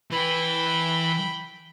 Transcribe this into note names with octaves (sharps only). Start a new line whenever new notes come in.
E3 B4 G5 B5